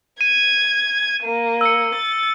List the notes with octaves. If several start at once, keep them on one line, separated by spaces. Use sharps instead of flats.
G#6 D#7
A#3
E6 C#7
A6